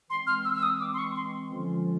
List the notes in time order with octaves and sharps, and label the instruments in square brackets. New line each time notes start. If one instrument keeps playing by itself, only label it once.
[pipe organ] E3 G#3 C4 [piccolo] C6
[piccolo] F6
E6
E6
D#6
D6
C6
C#6
C6
[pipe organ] D3 F3 G#3 C#4 F4